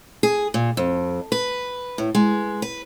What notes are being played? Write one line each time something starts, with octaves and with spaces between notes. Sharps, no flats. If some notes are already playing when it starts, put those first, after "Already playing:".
G#4
A#2
F2
B4
A2
G#3
B4